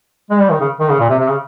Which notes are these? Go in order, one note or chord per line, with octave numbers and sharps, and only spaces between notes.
G#3
G3
D#3
C#3
D#3
C#3
A#2
C3
C3
C#3